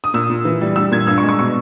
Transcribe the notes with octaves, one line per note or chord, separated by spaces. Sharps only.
D#6
A#2 E6
A#2
E3
G3
G3 E6
A#2 G#6
G2 E6
C#6
G#3
C#6
B2 C#6